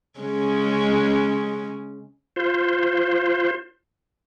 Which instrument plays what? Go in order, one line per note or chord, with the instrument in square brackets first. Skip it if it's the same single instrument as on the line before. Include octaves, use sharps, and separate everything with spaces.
[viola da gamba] C#3 G#3 C#4
[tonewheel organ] F4 C5